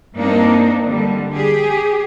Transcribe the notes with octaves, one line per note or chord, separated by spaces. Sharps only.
G2 A#3 C4 D4 D#4
D3 G3
G4 G#4